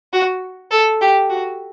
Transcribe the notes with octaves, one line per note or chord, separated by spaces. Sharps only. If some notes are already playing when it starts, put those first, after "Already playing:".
F#4
A4
G4
F#4